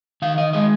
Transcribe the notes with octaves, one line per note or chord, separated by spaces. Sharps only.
D#3 F5
D#5
G#3 D#5